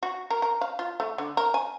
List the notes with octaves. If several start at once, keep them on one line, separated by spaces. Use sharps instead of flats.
F#4
A#4
A#4
F5
F4
A3
D3
A#4
G#5